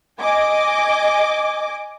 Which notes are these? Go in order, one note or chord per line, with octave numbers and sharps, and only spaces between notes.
D#5 G#5 D6